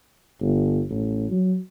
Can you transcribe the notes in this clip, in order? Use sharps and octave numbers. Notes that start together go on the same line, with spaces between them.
G1
A1
F#3